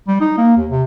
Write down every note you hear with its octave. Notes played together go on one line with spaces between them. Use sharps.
G3
D#4
A#3
D#2
C3